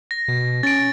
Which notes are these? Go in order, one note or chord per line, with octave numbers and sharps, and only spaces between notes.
A#6
B2
C#4 A6 D7